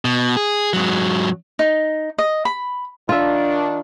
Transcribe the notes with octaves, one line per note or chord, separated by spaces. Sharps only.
B2
G#4
G#2 F#3
D#4
D#5
B5
D#3 D4 F4 E5